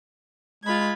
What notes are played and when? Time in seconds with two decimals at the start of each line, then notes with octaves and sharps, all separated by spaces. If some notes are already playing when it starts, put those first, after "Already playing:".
0.64 G#3 F4 B5 G#6